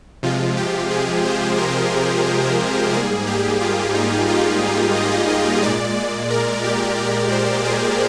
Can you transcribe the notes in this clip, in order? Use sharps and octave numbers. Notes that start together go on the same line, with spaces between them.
C3 F3 G#3 F4
G4
G#4
C5
A#4
G#2 G3 A#3 G#4
G4
F4
D#4
F4
D#5
D#5
A#2 G#3 D5
D5
A#4
G4
A#4
C5
G#4